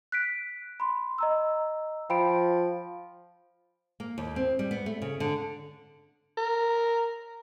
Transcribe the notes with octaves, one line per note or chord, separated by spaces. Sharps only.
F#6 B6 D7
B5 C6
D#5 A#5 E6
F3 G5 B5 D7
A#3
D#2
C4
G3
B3
A3
C#3
D3
A#4